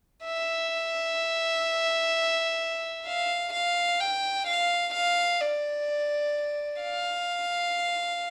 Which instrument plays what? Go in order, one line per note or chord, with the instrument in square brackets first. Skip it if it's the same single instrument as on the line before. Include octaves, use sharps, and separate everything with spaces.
[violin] E5
F5
F5
G5
F5
F5
D5
F5